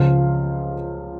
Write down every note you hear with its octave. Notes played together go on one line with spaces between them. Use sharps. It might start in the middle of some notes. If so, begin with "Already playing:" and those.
Already playing: C#2 C#3 F3 F4 F5